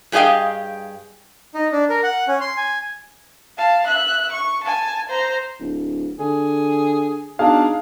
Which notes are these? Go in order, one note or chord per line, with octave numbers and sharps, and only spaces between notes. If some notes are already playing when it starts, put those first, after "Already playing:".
G2 G4 G#4 D#5 F5 G5
D#4
D4
A#4
F#5
C#4
C6
G#5
F5 A5
E5 F#6
C#6
G#5 A5
C5 A#5
D1
D3 G#4
B2 D4 D#4 G#4 F5